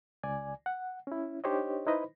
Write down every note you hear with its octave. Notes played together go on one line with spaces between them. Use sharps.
C#2 D5 G#5
F#5
C#4 E4
D4 D#4 G4 C5 C#5 D#5
D#4 E4 B4 C5 D#5 B5